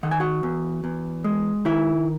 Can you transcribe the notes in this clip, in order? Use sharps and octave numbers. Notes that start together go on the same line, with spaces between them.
D#3 F#5
G#5
F#4 F#5
E2
E2
G#3
D#3 E4 E5